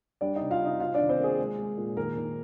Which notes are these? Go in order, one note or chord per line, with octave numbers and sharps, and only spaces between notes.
G3 D4 D5
C3 D#4 D#5
F4 F5
C3 D#4 D#5
C3 F4 F5
D4 D5
D#3
C4 C5
A#3
G#4
G#3
G#3
A#2
D#3 A#3 A#4
D#3